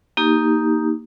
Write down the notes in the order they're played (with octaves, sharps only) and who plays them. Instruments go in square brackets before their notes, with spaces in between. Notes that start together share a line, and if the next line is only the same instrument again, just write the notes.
[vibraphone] A#3 D#4 G4